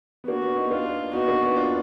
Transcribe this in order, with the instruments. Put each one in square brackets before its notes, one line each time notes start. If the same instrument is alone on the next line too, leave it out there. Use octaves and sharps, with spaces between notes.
[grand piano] B3
[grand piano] A#3 D4 [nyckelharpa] F#4
[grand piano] B3
B3 D#4
[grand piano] A#3 D4 [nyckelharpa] F4
[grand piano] B3 D#4 [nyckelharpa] F#4
[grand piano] A#3 D4
B3
D4 F4